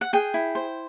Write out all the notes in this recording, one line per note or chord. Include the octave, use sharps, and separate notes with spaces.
F#5
G#4 G5
E4
C5